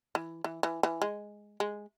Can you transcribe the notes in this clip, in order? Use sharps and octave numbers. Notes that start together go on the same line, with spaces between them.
E3
E3
E3
E3
G#3
G#3